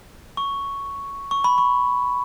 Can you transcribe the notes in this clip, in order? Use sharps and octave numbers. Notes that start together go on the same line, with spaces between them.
C#6
C#6
B5
C#6